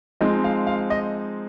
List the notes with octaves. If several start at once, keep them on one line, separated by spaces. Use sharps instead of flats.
F3 G#3 C4 D#4 D#5
F5
F5
D#5